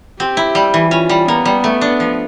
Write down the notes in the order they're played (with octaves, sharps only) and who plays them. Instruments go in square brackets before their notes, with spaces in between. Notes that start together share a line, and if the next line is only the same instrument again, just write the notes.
[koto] C4 [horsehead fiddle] G4
[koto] E4
G3
E3
[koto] C#4 [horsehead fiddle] F4
[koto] G3
[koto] A#3 [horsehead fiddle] B3
[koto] G3
A3
D4
F3